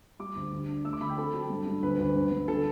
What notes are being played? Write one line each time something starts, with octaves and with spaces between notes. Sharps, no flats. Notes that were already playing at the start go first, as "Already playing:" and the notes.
G3 D6
D2
D3
D4
A3 E6
D6
D3 B5
G5
C4 A4
F#3
G2
G2
D2 B4
D2
G2
G2
D3 A4